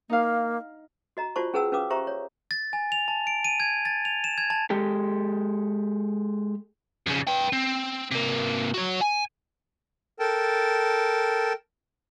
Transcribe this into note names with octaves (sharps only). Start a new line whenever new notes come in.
A#3 D#4 F5
F#4 D#5 A#5
F4 F#4 C5 D5 A5 C#6
C#4 G#4 B4 F#5 A5 E6
C#4 B4 F5 D6 D#6
G4 C5 E5 A#5 C#6
C#5
A6
G#5
F7
A5
D7
D#7
G#6
A6
F7
E7
G#6
A5
G#3 G4 A4
F2 C#3
B4 G5
C4
C3 A#3
F#4 C#5
G#5
A4 A#4 G5 A5